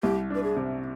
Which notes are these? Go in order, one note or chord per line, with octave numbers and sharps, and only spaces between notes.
C2 G4
D4 B4
G#4
C3